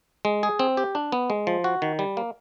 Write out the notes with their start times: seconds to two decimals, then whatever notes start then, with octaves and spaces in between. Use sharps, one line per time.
0.25 G#3
0.43 G#4
0.59 C4
0.77 G4
0.95 D4
1.12 B3
1.30 G#3
1.47 F3
1.64 F#4
1.82 D#3
1.99 G3
2.17 A#3